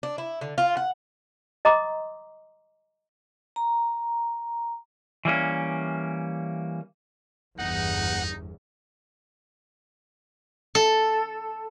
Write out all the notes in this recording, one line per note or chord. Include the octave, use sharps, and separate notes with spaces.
D4
E4
D3
F4
F#5
D#5 A#5 C6 D6 D#6
A#5
E3 G3 A#3 C#4
G1 E2 D#4 F#5
A4